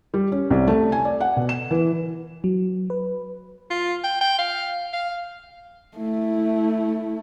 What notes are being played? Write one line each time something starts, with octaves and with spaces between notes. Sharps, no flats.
G3
C#4
C2
A3
G#5
D5
F#5
B2
E7
E3
F#3
B4
F4
G5
G5
F5
F5
A3 E4